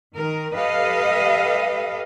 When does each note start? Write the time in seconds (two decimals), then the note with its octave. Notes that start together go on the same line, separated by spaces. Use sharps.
0.15 D#3 A#4
0.56 G4 A4 B4 D#5 F5